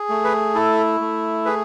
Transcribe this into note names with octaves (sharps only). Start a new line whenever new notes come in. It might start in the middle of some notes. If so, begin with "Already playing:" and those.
Already playing: G#4
A3
B4
E4 A4
A3
G#4 B4